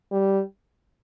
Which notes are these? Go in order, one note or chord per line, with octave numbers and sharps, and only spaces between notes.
G3